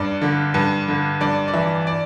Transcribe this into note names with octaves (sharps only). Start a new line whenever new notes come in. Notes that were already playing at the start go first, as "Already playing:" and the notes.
Already playing: G2 D5
D3
G2
D3
G2 D5
D5
E3 E5
D5